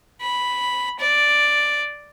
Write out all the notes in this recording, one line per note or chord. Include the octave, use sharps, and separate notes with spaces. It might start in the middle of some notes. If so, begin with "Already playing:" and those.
B5
D5